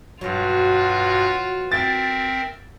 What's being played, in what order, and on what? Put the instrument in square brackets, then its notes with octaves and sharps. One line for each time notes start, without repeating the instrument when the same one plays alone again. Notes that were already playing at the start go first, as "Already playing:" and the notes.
[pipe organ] G2 [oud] B2 F#3 [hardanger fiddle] F4 F#4
[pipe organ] C4 A#4 E5 [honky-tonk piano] A6